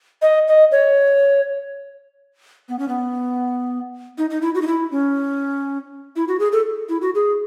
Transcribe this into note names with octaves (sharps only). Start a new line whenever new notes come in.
D#5
D#5
C#5
B3
C#4
B3
D#4
D#4
E4
F#4
D#4
E4
C#4
E4
F#4
G#4
A4
E4
F#4
G#4